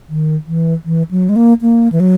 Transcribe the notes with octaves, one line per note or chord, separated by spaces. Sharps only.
D#3
E3
E3
F#3
G#3
A#3
A#3
E3
F#3